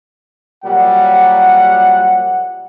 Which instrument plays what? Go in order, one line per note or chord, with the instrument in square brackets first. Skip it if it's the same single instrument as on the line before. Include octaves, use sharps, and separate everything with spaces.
[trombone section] A#2 F#3 G3 [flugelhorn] F#5